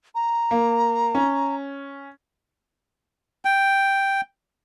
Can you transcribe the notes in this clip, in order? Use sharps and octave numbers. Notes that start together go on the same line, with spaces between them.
A#5
A#3
C#4
G5